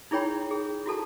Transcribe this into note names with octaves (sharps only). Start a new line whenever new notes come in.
D#4 E4 G#4 C#5 G5 B5
G#4
E4 F#4 A4 A5